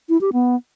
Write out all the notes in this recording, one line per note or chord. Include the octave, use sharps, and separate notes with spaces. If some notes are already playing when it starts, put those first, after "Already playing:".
E4
G4
B3